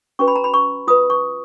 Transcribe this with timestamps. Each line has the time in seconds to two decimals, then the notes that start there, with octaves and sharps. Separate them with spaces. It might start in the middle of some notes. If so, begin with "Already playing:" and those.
0.19 C#4 F#4 B4 C#6
0.28 B5
0.36 A#5
0.44 B5
0.54 C#6
0.88 F4 B4 D#6
1.10 C#6